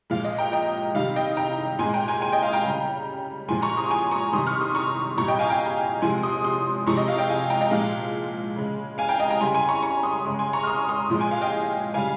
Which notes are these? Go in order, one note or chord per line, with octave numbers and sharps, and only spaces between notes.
A#2 F3 G#3 F5
D#5
G5 A#5
D#5 G5
C3 D#3 G3 F5
D#5 G5
G5 A#5
A#2 G#3 G#5 C6
G5 A#5
G#5 C6
G#5 C6
D#5 G5
F5
G5 A#5
C#3 G3
A#2 F3 G#3 G#5 C6
A#5 C#6
C6 D#6
G#5 C6
A#5 C#6
C3 D#3 G3 C6 D#6
C#6 F6
C6 D#6
A#5 C#6
A#2 G3 A#5 C#6
D#5 G5
F5 G#5
G5 A#5
C3 F3 G#3 G#5 C6
C6 D#6
C6 D#6
C3 F3 G#3 A#5 C#6
D#5
F5
D#5 G5
F5 G#5
G5 A#5
D#5 G5
A#2 F3 G#3 F5
C#3 G#3
F5 G#5
G5 A#5
D#5 G5
G5 A#5
C#3 G3 G#5 C6
G#5 C6
A#5 C#6
A#5 C#6
C6 D#6
C#3 G#3
G#5 C6
A#5 C#6
F6
C6 D#6
C6 D#6
A#2 F3 G#3
G#5 C6
F5
D#5 G5
C#3 G3 F5 G#5